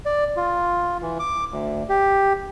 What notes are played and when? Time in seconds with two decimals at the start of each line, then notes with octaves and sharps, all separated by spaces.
0.05 D5
0.36 F4
1.02 E3
1.19 D6
1.52 D2
1.89 G4